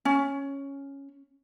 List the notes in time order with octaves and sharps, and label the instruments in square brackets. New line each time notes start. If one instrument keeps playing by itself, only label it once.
[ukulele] C#4